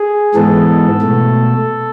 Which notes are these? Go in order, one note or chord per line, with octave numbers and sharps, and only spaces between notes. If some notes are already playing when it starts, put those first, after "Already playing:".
Already playing: G#4
G#2 E3 G#3 B3 A4
B2 A3